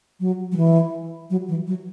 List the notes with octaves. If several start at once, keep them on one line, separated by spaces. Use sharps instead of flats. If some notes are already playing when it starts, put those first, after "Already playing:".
F#3
F#3
E3
F#3
E3
F#3